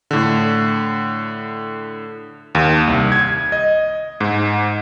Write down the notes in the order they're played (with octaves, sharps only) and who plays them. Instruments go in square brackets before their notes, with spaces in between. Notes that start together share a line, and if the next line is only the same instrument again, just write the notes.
[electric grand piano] A2 D3
D#2
C2
G#6
D#5
G#2